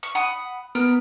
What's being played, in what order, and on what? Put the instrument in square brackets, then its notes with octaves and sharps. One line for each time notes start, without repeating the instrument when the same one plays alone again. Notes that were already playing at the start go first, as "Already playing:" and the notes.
[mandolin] C#6
F#5 B5 D#6
[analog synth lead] B3 [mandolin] A#4